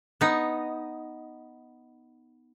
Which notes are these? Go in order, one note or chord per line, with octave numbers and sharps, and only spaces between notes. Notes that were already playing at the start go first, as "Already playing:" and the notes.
B3 D#4